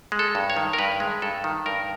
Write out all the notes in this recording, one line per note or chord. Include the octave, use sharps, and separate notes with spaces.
G#3
A4
G2
C#5
D#3
A#4
G2 B4
G#3
G2 A4
D#3
G2 A#4